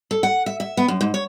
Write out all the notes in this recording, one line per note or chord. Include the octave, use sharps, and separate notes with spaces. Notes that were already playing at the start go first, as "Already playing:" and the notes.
A4
F#5
E5
E5
B3
F#2
G#2
C#5